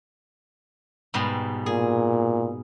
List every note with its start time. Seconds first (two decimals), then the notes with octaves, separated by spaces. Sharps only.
1.14 G#2 B2 G3
1.66 A#2 G#4